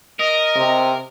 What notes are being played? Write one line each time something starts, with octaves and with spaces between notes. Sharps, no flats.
A#4 D#5
C3